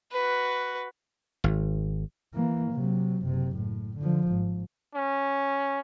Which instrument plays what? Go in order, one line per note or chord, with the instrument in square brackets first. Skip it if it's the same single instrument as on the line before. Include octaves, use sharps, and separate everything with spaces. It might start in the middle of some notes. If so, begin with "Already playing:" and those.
[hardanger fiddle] F#4 B4
[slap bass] G#1
[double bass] E3 A#3
C3 F#3
F#1 C3
A2
D3 F3
G#1
[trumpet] C#4